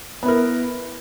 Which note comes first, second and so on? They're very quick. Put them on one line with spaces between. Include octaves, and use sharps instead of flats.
B3 E4 A#4